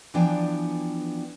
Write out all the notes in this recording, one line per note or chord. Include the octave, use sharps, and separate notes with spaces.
E3 F3 B3 D4 G5 G#5